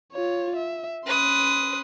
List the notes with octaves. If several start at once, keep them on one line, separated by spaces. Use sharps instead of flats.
F4 C#5
E5
C#4 B4 C6 D#6